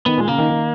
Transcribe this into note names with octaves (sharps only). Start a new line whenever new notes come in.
D#3 B3
A#2
G#3
C#3 A#3
D#3
D#3